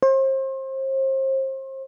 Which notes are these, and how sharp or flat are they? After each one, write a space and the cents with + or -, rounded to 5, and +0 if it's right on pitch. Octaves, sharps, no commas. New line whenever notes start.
C5 +35